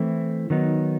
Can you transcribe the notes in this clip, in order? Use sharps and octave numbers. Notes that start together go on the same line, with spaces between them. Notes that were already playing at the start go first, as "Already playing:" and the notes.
Already playing: E3 A3 C4 E4
D#3 F#3 B3 D#4